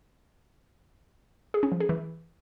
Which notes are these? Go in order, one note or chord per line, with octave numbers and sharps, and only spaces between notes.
G#4
C#4
F3
G#4
E3